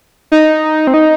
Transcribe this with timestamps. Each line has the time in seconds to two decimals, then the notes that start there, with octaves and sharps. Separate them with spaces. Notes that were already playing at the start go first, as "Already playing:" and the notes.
0.32 D#4
0.87 C4
0.94 D#4